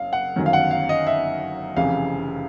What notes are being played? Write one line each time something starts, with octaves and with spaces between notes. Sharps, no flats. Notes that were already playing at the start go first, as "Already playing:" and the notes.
Already playing: F#1 F5
F#5
G1 F#2 D#3 F#3
F5
F#5
F5
D#5
E5
F1 F2 C#3 E3 F5